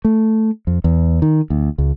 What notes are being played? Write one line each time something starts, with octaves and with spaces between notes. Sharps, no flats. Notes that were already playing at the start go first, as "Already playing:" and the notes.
A3
F2
E2
D#3
D2
C#2